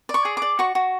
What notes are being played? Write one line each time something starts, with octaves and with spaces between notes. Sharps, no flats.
D5
C#6
G#4
D5 D6
F#4 C#6
F#4